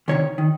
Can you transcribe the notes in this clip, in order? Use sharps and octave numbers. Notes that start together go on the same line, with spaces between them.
D2 C3 D#3 C#5
D#3